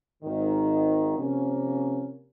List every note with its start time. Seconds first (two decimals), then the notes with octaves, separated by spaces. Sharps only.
0.22 G#1 G#2 D#3
1.18 C3 F3 A#3 C#4